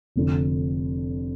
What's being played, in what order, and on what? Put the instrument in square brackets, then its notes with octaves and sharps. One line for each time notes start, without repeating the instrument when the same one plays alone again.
[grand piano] F1 F2 D3